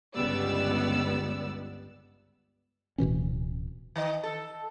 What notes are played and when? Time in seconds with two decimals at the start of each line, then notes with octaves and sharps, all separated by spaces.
0.15 G1 C#2 G3 B3 D5 E6
2.98 D1 B2 E3 C#4
3.96 D#3 D#5
4.23 A4